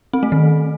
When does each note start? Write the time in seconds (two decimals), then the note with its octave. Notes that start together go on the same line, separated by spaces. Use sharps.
0.13 C4
0.23 A3
0.32 D#3